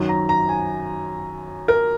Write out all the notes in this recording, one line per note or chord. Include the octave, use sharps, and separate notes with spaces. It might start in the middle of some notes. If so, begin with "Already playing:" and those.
Already playing: F#2 D#3 F#3
A#5
A#5
G#5
A#4